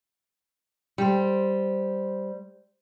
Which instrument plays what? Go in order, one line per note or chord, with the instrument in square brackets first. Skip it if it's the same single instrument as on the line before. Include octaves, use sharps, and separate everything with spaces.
[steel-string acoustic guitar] G3 C5